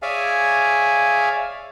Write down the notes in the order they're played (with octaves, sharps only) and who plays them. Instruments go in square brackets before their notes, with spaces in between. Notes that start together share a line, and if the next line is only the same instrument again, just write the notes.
[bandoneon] G#4 C#5 D5 E5 F5 G#5